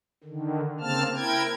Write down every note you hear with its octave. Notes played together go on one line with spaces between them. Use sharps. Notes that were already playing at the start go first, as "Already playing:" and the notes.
D3 D#3
C#3 A#3 C4 A5 F6
E4 A#4 G5 G#6